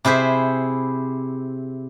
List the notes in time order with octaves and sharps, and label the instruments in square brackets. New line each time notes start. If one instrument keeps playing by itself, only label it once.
[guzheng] C3 E4 G#4 C5 E5